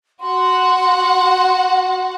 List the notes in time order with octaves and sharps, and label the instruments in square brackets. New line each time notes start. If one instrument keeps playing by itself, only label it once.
[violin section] F#4 F#5 [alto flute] C6